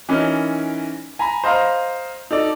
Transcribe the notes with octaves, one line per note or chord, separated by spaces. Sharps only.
E3 C#4 D#4 A#4
G#5 A#5 B5
C5 D#5 F5 A#5
D#4 A4 D5